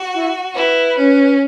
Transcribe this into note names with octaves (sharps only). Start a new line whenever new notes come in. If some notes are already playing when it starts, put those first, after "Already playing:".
Already playing: F#4
E4
E4 B4
C#4